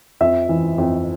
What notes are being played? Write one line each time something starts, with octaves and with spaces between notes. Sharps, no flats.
F2 E5
E3
F2